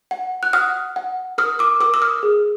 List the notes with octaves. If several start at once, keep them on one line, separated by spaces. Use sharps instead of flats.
F#5
F#6
F#5 D#6 F6
F#5
A#4 D#6 F6
D6 E6
A#4 D6 E6
E6
D#6 F6
G#4